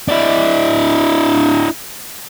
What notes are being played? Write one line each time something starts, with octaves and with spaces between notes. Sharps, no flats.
D4 E4